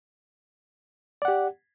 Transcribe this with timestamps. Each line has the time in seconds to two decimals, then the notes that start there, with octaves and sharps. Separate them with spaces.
1.22 D5
1.25 F#5
1.28 G4